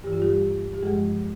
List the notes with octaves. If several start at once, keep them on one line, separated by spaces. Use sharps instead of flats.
G2 E3 G4
F4
G3 G4
G4
G2 F3 G#3 G#4